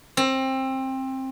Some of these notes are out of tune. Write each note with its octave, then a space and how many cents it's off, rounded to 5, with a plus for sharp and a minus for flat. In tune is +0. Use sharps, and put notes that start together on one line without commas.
C4 +20